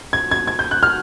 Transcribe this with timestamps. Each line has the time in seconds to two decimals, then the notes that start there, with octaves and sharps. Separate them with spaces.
0.13 G#6
0.31 G#6
0.47 G#6
0.59 G6
0.71 F#6
0.83 F6